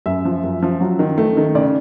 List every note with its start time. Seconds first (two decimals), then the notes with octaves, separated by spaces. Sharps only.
0.06 F#2 E5
0.25 F3
0.44 F#2
0.62 F3
0.80 F#3
0.99 D#3
1.18 A3
1.37 D#3
1.55 C#3 D5